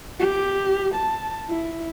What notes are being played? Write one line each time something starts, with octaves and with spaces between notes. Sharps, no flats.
G4
A5
E4